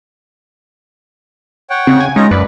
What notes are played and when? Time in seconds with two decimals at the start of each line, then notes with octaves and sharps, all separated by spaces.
1.70 C#5 F#5 G5
1.87 C#3 C4
2.00 G#5
2.16 G#3 C#4 D#4 F4 A#5
2.31 F#2 B4 D5